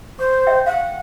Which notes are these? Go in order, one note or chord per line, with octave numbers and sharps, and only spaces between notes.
C5 C#6
D#5 E5 G5
F5 F#5